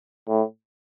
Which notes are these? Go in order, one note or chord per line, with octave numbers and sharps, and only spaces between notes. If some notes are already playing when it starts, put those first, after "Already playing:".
A2